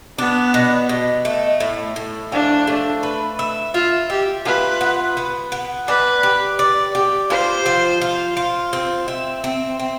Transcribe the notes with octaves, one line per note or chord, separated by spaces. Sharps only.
B3 D4
B2
B2
A3
A2
A2
F3 D4
A3
B4
E5
F4 E5
G4 E5
F4 B4
B3
B3
B3
B4 D5
G4
D5
G4
F4 C5
F3
F4
F4
C4
E5
C4
C4